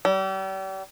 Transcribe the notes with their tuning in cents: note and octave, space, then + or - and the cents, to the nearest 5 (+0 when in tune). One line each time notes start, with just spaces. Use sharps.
G3 -40